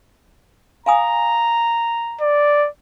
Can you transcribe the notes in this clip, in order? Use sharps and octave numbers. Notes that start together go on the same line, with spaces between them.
F5 G#5 A#5 D#6
D5